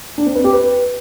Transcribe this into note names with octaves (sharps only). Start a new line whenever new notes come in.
D4
C4
B4
G4
B4